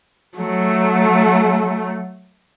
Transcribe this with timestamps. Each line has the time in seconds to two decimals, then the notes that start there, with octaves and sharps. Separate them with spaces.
0.37 F#3 A3